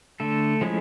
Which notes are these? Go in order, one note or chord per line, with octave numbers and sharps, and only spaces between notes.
D3 A3 A4
F3 G#3 C#4 E4